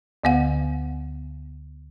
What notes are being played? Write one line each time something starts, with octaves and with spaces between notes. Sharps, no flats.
D2 D3 B3 F5 F#5